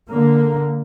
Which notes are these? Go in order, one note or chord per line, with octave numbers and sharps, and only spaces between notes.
D3 A#3